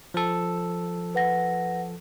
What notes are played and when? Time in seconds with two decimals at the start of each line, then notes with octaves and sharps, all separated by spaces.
0.14 F3 A4
1.15 B4 F#5 A#6